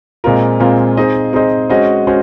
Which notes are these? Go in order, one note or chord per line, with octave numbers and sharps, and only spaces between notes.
A#2 G#3 C4 F4 A#4
A#2 G#3 C4 F4 A#4
C4 D#4 G#4 C5 D#5
C4 D#4 G#4 C5 D#5
G#3 C#4 F#4 C5 D#5
G#3 C#4 F#4 C5